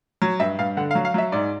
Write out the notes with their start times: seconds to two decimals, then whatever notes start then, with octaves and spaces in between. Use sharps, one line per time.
0.22 F#3
0.40 G2 E5
0.59 G2 F5
0.77 D3 F#5
0.91 F5
0.95 F#3
1.05 F5
1.14 F#3 E5
1.32 G#2 D5